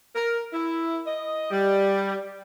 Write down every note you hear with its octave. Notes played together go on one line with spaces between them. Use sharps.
A#4
E4
D#5
G3